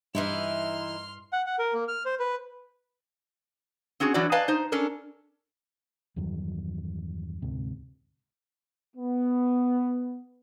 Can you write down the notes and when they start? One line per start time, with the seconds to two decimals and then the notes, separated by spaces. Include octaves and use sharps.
0.15 G2 E3 D#4 E4 C6 F6
1.33 F#5
1.46 F#5
1.59 A#4
1.73 A#3
1.88 F6
2.05 C5
2.20 B4
4.00 C4 C#4 F#4 G#4
4.14 E3 F#3 D4 F#4 D5
4.32 B4 D5 D#5 F5 G#5 A5
4.48 D#4 C5
4.72 C#4 D4 A4 A#4
6.16 E2 G2 D#3 F#3
7.42 D2 G#2 C3
8.96 B3